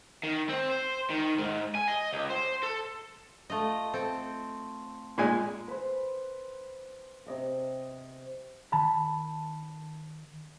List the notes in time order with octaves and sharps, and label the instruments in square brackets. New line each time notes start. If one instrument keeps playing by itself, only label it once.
[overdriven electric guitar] D#3
C4
C5
D#3
G#2
G#5
D#5
C#2
C5
A4
[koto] A3 F4 D#5
C4 A4
[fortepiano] A#2 G#3 G#5
[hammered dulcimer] B4 C5
C3 D#5 D6
[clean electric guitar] D#3 A5 B5